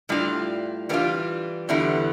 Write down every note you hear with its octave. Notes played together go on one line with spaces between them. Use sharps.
A2 G3 D4 F4
E3 G3 B3 D4 F4
E2 D3 G3 B3 E4